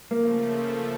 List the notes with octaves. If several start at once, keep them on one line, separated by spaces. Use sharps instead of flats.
C#3 F3 A3 A#3